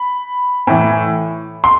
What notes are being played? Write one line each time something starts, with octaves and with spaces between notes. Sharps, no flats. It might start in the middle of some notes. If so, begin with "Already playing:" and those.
Already playing: B5
A2 E3
C6